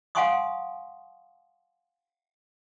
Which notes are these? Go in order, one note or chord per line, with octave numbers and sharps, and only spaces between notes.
F5 F#5 G#5 C6 C#6 D#6